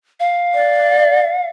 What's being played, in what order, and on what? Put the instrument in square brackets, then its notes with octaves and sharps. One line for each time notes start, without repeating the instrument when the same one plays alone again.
[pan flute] F5
[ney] D5